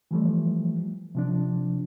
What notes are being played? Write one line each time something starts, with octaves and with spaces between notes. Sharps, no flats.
E3 F3 G3 A3
C3 F3 D4